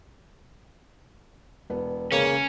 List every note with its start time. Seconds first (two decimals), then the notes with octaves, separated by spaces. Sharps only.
1.70 E1 B3
2.12 C#3 A#3 C#4 C#5